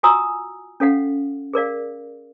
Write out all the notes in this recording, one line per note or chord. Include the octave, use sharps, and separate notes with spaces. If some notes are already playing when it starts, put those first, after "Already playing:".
F4 F#4 G#5 A#5 D#6 E6
C#4 A4 F5 F#5
G#4 A#4 D5 F5